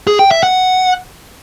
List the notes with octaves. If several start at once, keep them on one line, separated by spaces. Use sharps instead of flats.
G#4
G5
E5
F#5